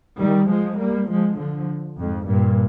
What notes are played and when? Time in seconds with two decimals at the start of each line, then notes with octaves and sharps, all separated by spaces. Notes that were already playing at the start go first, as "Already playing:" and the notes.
0.18 D#3 G3
0.48 F3 G#3
0.79 G3 A#3
1.08 F3 G#3
1.38 D3 F3
1.98 F2 G#2
2.27 G2 A#2